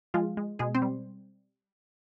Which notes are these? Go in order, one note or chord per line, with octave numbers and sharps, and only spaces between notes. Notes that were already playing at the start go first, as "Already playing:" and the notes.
F3 G#3 F4
G#3
B2 G#3 G#4
C4 C5
G3